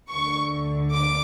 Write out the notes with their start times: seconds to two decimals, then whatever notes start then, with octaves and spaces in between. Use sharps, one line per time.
0.11 D2 D3 C#6
0.93 D6